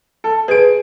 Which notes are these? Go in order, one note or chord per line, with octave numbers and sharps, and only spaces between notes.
A4
G#4 B4 D7